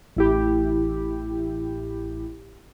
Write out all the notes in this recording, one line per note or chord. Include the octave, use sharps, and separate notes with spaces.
A1 E4 G4